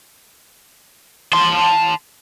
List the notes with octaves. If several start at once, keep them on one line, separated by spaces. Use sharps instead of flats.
A5 C6